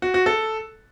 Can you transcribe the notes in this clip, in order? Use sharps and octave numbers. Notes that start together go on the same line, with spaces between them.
F#4
F#4
A4